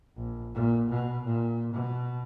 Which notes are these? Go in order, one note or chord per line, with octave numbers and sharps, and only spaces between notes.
A#1
A#2
B2
A#2
B2